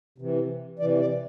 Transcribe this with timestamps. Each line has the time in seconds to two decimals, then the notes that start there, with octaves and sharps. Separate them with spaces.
0.18 C3 E3
0.79 E3 D5
0.82 C3
1.00 D5